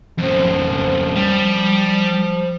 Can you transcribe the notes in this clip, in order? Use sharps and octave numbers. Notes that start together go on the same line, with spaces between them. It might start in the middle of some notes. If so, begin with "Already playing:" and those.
F2 C#3 F3
G3